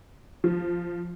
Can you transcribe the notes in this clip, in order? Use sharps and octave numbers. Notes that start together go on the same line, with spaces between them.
F3